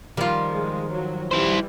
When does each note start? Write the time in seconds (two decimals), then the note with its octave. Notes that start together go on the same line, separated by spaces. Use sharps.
0.17 D#3 F3 G3 F4
0.53 G#3
0.92 F#3
1.31 E3 G3 E4 C5